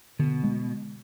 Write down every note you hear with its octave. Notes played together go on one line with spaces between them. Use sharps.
B2 D3
G#3